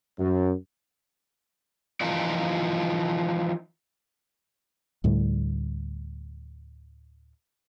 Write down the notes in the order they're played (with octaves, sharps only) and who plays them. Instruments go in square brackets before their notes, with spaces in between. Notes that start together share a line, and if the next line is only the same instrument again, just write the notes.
[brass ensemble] F#2
[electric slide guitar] E3 F3 D#4 F4 D5
[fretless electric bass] D2 A2 D3 G3